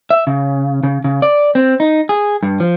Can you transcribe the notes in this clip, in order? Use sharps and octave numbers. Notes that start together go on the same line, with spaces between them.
E5
C#3
C#3
C#3
D5
C4
D#4
G#4
G2
F3